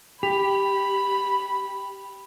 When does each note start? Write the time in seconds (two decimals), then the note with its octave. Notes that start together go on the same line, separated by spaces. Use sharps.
0.23 G4 B5